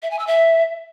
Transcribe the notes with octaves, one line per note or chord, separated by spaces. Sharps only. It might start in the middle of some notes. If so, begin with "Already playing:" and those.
E5
G#5
E6
E5